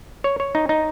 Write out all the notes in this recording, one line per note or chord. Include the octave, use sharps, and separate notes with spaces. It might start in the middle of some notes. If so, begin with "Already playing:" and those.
C#5
C#5
D#4
D#4